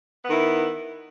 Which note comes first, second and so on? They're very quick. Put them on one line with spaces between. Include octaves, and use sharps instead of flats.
B3 D#3 E4